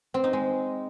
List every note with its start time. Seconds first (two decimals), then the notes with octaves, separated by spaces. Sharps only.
0.14 C4
0.24 D#4
0.33 G#3